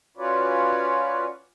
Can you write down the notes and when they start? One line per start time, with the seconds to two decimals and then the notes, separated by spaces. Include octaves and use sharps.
0.17 C#4 F4 F#4 B4 C#5 D5